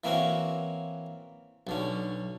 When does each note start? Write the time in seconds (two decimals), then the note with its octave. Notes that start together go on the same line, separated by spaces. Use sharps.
0.04 E3 A#3 C4 C#4 F#4
1.67 B1 D3 C#4